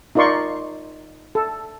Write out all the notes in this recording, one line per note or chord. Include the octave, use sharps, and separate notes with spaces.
D#4 F4 A#4 D5 C6 C#6
A4